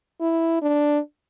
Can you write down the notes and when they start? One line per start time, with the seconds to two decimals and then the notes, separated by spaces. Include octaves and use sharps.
0.21 E4
0.62 D4